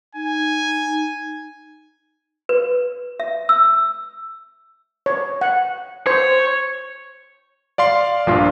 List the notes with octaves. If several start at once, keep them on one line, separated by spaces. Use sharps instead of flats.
D#4 G#5
B4
E5
E6
C#5
F#5
C5 C#5
D5 F5 C6 C7
A#1 G2 A#2 F4